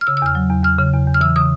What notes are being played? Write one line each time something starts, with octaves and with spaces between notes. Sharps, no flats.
F6
C#3 E6
E6
E2 F6
F#3
E2
E2 F6
C#3
E2
E2
F6
E3 E6
C#3 D#6